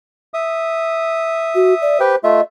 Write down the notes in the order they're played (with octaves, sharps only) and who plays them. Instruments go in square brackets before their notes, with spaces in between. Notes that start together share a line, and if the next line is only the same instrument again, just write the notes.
[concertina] E5 D#6
[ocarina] F#4
D5
[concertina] G4 B4 G5 [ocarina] C5
[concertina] A3 F4 E5 [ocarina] D#5